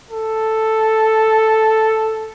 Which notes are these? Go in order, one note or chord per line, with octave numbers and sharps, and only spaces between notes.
A4